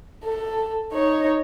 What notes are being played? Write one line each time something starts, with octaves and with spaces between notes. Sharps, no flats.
A4
D#4 C#5